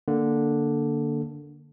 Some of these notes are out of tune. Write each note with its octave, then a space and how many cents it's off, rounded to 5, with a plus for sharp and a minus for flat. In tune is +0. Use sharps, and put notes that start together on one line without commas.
D3 +0 A#3 +0